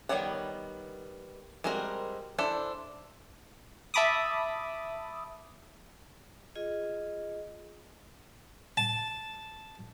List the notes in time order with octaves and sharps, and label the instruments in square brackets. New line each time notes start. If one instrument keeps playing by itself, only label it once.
[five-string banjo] D#3 G3 B3 C#5 F#5
G3 G#3 C4 F#4 A#4
D4 E4 A4 C5
[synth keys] E5 A5 B5 D6 D#6
[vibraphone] F4 G#4 D#5
[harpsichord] A5